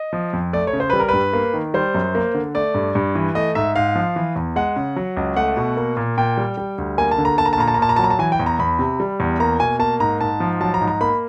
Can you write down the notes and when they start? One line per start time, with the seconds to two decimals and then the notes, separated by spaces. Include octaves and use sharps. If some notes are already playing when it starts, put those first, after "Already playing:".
Already playing: D#5
0.13 F3
0.33 F2
0.53 A3 D5
0.67 C#5
0.73 C#3
0.80 C5
0.90 G3 B4
1.00 A#4
1.08 G2 B4
1.33 A#3
1.54 D#3
1.74 G3 C5
1.95 F#2
2.15 A#3
2.35 D3
2.55 A3 D5
2.74 G2
2.95 G2
3.15 E3
3.35 A3 D#5
3.55 G#2 E5
3.76 G#2 F5
3.95 F3
4.16 E3
4.36 E2
4.56 G#3 F#5
4.76 C#3
4.96 F#3
5.17 C#2
5.36 A3 F#5
5.57 B2
5.77 A#3
5.97 A#2
6.18 A#2 G5
6.38 G3
6.57 G3
6.78 D2
6.98 A#3 G#5
7.11 A5
7.18 D3
7.25 A#5
7.38 A#3 A5
7.45 A#5
7.53 A5
7.58 A#2 A#5
7.68 A5
7.74 A#5
7.79 A#2 A5
7.89 A#5
7.96 F#3 A5
8.04 A#5
8.10 A5
8.19 E3 G#5
8.32 G5
8.40 E2
8.46 A#5
8.59 E2 B5
8.79 C3
9.00 G3
9.20 E2
9.40 A#3 A#5
9.60 B2 G#5
9.79 A#3 A5
10.00 G#2 A#5
10.20 G#2 A5
10.40 F3
10.61 F#3 A5
10.74 A#5
10.81 G#2
10.88 A#5
11.01 A#3 B5